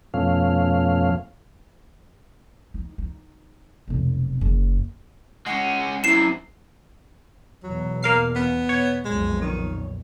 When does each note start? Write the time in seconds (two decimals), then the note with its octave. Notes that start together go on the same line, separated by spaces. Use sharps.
0.14 F2 B2 F3 A3 C#4 F5
2.74 D#4
2.98 D#4
3.88 F1 B1
4.41 F#1
5.46 G#3 C#4 F#5
6.04 F#2 C3 E4 C7 E7
7.64 E2 B2 F#3
8.03 A#3 F5 C7
8.36 B3
8.69 C#5
9.05 B1 F2 A#2 G#3
9.42 D#3